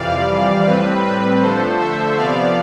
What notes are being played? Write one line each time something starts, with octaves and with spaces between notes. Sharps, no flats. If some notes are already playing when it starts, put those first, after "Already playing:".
Already playing: F2 C3 E3 G3 D5 F5
A2 G3 C4 B4
B4
D3 F3 A3 A4 C5
C5 E5
C3 F3 B3 D5 F5